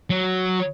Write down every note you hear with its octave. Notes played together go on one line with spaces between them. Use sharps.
F#3